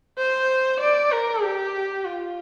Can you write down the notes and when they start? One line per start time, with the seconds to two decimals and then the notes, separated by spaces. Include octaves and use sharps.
0.18 C5
0.80 D5
1.11 A#4
1.42 G4
2.05 F4